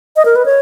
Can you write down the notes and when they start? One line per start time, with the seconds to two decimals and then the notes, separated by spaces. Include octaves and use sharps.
0.16 D#5
0.25 A#4
0.36 B4
0.46 C#5